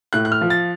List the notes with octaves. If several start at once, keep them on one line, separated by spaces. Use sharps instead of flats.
A2 F#6
F#6
F6
F3
A6